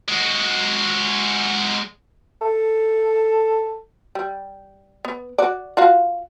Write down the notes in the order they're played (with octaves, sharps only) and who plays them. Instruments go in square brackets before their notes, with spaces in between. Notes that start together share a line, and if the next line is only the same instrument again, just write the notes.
[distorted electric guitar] G#3 F#4
[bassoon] A4
[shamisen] G3
B3
F#4 D5
F4 F#4 F5